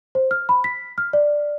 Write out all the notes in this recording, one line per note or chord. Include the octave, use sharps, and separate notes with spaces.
C5
F6
B5
B6
F6
D5